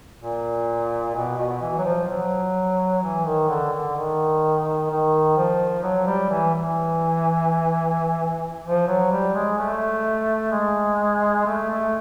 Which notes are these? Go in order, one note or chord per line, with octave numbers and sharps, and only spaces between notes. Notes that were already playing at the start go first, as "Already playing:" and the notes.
A#2
B2
B2
E3
F#3
F3
F#3
E3
D#3
D3
D3
D#3
D#3
F3
F#3
G3
E3
E3
F3
F#3
G3
G#3
A3
G#3
A3
A3